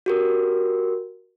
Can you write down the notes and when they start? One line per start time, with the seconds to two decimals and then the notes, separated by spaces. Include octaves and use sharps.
0.06 F#4 G4 A#4